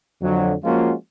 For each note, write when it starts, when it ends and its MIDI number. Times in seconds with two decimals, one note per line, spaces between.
0.22 0.54 41
0.22 0.54 50
0.22 0.54 54
0.64 0.93 53
0.64 0.93 56
0.64 0.93 58
0.64 0.93 61
0.64 0.93 65
0.64 0.93 66